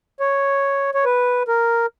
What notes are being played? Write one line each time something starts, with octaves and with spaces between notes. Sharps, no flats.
C#5
C#5
B4
A#4